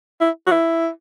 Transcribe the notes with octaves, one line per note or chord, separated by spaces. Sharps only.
E4
F#4
E4